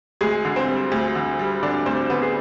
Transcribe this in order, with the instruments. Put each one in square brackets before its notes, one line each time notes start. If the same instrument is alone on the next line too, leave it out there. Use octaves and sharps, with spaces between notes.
[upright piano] D2 G#3 G#4
D3
C4 C5
G3
D2
D3
G3
D3 D4 D5
D2 C4 C5
D3 B3 B4
G#4